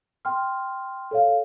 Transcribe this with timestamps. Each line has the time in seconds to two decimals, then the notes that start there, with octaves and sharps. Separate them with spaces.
0.25 G5 C6 F6
1.11 A4 C#5 F5